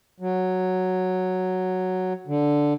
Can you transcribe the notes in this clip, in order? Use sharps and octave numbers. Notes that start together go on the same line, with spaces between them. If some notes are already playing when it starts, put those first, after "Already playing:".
F#3
D3